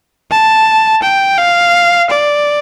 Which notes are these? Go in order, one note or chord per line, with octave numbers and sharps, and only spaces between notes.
A5
G5
F5
D5